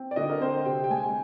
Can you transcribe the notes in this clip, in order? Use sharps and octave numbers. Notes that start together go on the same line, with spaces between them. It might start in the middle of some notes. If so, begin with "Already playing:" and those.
Already playing: C4
D5
D3 D#5
A#4
C4 C5
C3 G5
G5
G#3 G#5